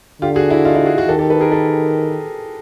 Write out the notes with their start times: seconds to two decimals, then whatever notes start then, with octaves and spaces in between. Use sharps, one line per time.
0.21 D3 F4 G4
0.36 F#4 G#4
0.50 E4 F#4
0.65 D#4 F4
0.75 E4 F#4
0.86 F#4 G#4
0.97 F#4 G#4
1.08 D#3 G4 A4
1.19 G4 A4
1.30 A4 B4
1.41 G#4 A#4
1.52 A4 B4